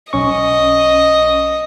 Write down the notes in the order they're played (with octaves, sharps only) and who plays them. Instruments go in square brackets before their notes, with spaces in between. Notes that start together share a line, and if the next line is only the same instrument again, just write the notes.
[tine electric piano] B1 C#4 C#6 [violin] D#5